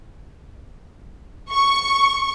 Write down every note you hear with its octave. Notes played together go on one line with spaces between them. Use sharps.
C#6